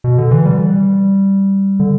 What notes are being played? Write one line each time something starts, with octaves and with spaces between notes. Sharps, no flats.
B2
D3
E3
G3
D3